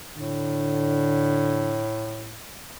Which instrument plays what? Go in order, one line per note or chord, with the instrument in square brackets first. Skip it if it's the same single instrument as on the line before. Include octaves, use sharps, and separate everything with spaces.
[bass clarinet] A2 [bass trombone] D3